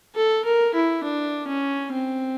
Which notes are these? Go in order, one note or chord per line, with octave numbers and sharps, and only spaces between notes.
A4
A#4
E4
D4
C#4
C4